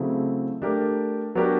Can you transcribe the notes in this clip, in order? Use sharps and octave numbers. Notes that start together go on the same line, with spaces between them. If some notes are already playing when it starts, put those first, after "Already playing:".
Already playing: C#3 F#3 A3 C4 E4
A3 D4 G4 A#4
F#3 B3 D4 G4 A#4